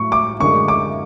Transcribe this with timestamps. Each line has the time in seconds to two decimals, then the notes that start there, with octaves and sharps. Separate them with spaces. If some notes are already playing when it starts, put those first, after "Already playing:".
Already playing: A2 F#3 A3 C#6
0.12 D6
0.40 F#2 D3 G#3 C#6
0.68 D6